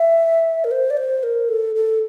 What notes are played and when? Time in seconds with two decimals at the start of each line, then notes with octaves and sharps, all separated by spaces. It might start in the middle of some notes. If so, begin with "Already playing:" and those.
Already playing: E5
0.64 A#4
0.71 C5
0.90 D5
0.97 C5
1.23 A#4
1.49 A4
1.75 A4